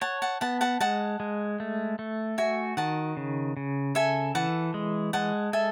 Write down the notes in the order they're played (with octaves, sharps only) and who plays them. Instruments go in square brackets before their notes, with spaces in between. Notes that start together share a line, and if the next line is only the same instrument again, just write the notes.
[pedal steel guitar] C#5 [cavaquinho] F#5 A5
[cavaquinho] F#5 A5
[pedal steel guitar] B3 [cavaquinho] F#5 A5
[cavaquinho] F#5 A5
[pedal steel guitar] G#3 [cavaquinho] F#5 A5
[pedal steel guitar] G#3
A3
A3
[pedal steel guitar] F#4 [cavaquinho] E5 G#5
[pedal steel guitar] D#3 [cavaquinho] F#5 A5
[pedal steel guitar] C#3
C#3
[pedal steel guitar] A4 [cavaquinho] E5 G#5
[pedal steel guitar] E3 [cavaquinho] F#5 A5
[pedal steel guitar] G#3
[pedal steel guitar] G#3 [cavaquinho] F#5 A5
[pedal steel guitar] A4 [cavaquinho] E5 G#5